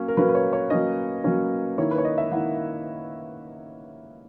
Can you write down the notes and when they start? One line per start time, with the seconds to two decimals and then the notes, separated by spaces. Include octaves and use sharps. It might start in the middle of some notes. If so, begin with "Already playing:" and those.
Already playing: F#3 A#3 C#4
0.08 A#4
0.17 F#3 A#3 C#4 B4
0.29 B4
0.35 C#5
0.53 C#5
0.70 F#3 A#3 C#4 D#5
1.24 F#3 A#3 C#4
1.78 D#3 A#3 E4 C#5
1.91 B4
1.98 C#5
2.05 D#5
2.18 E5
2.31 D#3 A#3 E4 F#5